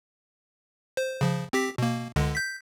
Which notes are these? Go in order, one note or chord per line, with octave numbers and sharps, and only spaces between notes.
C5
C#3 F3
C4 G4 B6
B2 A#3
C#2 D3 G#3
G6 B6